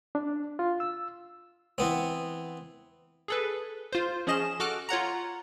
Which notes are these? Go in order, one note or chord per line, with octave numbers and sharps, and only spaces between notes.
D4
F4
E6
E3 B3 C4
G#4 A4 B4
F4 C5
F3 C#4 G#4 D#5 E7
F#4 A4 D6 F6 F#6
F4 C#5 F#5 A#5